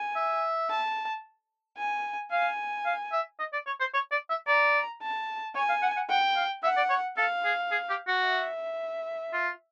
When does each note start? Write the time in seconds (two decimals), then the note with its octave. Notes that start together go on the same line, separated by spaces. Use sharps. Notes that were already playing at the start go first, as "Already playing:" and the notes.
Already playing: G#5
0.16 E5
0.70 A5
1.77 G#5
2.32 F5 G#5
2.86 F5
3.13 E5
3.39 D#5
3.53 D5
3.67 C#5
3.80 C5
3.94 C#5
4.11 D5
4.30 E5
4.47 D5 A#5
5.02 A5
5.55 C#5 G#5
5.69 F5
5.82 F#5
5.97 F#5
6.09 F#5 G5
6.36 F5
6.64 E5 F#5
6.77 D5
6.90 C#5
7.17 A4 F5
7.45 G#4
7.72 G#4
7.89 G4
8.07 F#4
8.26 E5
9.33 F4